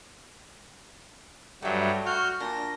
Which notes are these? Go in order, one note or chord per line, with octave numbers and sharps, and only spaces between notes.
G2 F#3 G3 A3 E5
F#4 F6 G6
A#2 D4 A#6